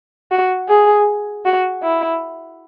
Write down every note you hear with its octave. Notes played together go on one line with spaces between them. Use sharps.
F#4
G#4
F#4
E4